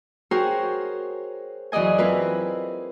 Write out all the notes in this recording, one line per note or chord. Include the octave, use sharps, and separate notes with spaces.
F#4 G#4 A#4 C5 C#5 G5
F#2 E3 G#4 D5 D#5 G#5
C4 E4 F4 A#4 B4